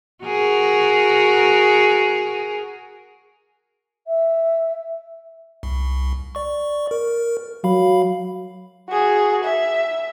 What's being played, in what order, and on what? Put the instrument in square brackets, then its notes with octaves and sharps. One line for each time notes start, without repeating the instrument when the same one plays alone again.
[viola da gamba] F#4 G#4 A#4
[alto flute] E5
[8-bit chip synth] C2
D5 C#6
A#4
[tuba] F#3 [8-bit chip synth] F5 B5
[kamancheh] F#4 G#4
E5